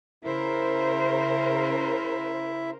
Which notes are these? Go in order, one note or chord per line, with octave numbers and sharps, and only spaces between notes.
C#3 E4 A#4 C5 E5